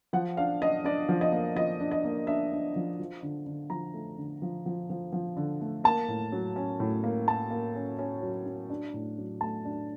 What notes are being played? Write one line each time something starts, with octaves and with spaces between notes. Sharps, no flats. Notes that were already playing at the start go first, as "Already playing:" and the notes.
F3 F#5
D4 F5
D4 D#5
D4 D5
F3
D#5
A#3
F3 D#5
D4
D#5
A#3
D4 E5
D4
F3
F3
D3
D3
F3 A#5
A3
D3
F3
F3
F3
F3
D3
A3
A#3 A5
A2
F#3
C#4
A2
A#3
A#3 A5
A#3
C#4
C#4
F#3
F#3
D4
A2
F#3
A3 A5
D4